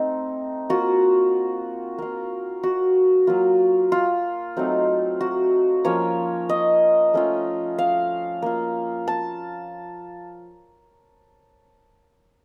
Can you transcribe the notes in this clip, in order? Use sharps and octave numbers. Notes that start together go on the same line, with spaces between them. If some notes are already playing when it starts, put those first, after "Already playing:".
Already playing: A3 C4 D#4
A#3 F4 F#4
A#3 F4
F#4
F#3 A#3 F4
F4
F#3 A3 C4 D#4
F#4
F3 A#3 C#4 F4 C#5
D#5
A3 C#4 F4
F5
A#3 F4
A5